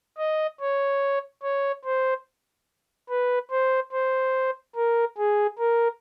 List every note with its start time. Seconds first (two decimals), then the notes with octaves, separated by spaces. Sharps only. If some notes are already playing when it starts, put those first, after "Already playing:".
0.18 D#5
0.60 C#5
1.43 C#5
1.85 C5
3.10 B4
3.51 C5
3.92 C5
4.76 A#4
5.17 G#4
5.59 A#4